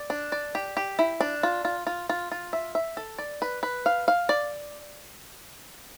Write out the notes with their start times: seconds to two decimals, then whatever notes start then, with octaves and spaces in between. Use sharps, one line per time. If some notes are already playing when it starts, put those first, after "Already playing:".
Already playing: D5
0.10 D4
0.32 D5
0.55 G4
0.77 G4
0.99 E4
1.21 D4
1.43 F4
1.65 F4
1.87 F4
2.10 F4
2.32 F4
2.53 E5
2.75 E5
2.97 A4
3.19 D5
3.42 B4
3.63 B4
3.86 F5
4.08 F5
4.29 D5